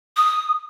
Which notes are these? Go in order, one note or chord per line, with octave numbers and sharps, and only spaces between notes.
D#6